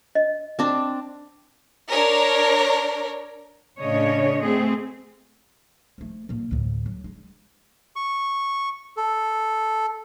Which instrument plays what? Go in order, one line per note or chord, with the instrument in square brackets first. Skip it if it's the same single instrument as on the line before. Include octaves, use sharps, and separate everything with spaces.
[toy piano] D#5
[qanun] C4 D4
[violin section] D4 A#4 C#5
[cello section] A2 C#3 D4 C#5 D#5
A3 C4 G#4
[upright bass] F3 A3
A#2 A#3
D2 A2
F#3
G#3
[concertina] C#6
A4